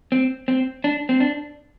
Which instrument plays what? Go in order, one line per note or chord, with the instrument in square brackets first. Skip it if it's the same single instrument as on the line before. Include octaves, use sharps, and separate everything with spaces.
[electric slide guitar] C4
C4
D4
C4
D4